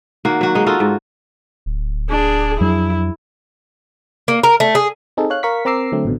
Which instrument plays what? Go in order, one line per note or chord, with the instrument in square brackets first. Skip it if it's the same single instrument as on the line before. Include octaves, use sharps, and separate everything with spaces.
[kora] D#3 A#3 F#4
F#3 F#4
G#3 D#4
D#4 F4 F#4 A4
G#2
[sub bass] D1
[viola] D4 G#4
[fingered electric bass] F2 F#3 D4 [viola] E4
[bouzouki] A#3
A#4
A3
G#4
[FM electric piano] C4 D#4 G#4 A4
C#5 F5 F#6
A#4 F5 C#6 B6
C4 A#4 A#5 D6 E6 C7
D3 F#3 A3 C4
A1 B2 D3